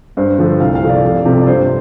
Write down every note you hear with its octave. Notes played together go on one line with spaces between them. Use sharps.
G2 C5
D3 F3 A3
C2 F5
F5
C3 F3 A3
D5
F2
C3 F3 A3
D5
G2 C5